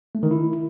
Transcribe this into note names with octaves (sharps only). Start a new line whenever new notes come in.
A3
D#3
E4